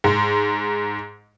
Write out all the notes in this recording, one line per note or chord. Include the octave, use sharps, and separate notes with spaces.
G#2